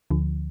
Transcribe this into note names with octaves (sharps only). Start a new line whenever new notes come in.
D2 D3 F3